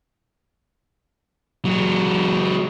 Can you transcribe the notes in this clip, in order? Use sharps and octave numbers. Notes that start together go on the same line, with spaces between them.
F#3 G#3